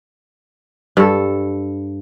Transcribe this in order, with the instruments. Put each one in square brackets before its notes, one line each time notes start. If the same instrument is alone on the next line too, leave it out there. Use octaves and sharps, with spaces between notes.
[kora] G2 A4